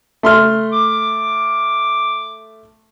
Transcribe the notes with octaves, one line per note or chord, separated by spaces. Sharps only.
A3 C6 F6
D6